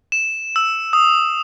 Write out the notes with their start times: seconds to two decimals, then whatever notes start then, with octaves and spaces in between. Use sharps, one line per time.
0.12 E7
0.56 E6
0.93 D#6